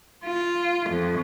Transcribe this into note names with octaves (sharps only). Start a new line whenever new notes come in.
F4
F2